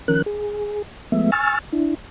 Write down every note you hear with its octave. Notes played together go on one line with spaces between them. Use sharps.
D#3 F3 C#4 A#4 F#6
G#4
F3 G#3 A3 B3 E5
G#5 C#6 E6 F6 A6
D4 E4